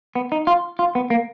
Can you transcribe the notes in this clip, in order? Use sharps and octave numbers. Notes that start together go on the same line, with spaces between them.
B3
D#4
F4
F4
B3
A#3